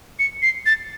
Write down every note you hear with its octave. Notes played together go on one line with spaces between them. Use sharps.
C#7
C7
A6